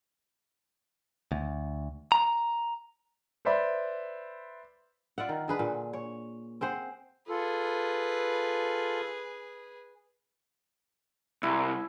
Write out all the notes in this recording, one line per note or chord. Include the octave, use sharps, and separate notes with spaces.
D2
A#5
B4 C5 D5 E5 B5
F4 D5 E5 F#5
D#3
D3 G#4 B4
A#2
C#5
C4 G#4 C5 F#5
F4 G#4 A4 B4
C2 E4